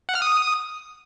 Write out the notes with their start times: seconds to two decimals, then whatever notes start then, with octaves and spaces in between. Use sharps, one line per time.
0.09 F#5
0.15 F6
0.22 D#6